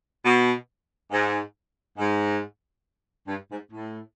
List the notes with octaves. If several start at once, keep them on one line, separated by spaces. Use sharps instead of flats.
B2
G#2
G#2
G2
G#2
A2